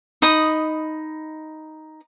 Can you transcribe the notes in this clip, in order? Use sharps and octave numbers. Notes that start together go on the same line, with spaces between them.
D#4 B5 D#6